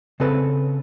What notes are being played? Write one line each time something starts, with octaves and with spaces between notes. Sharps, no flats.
C#3 C4 A4 B4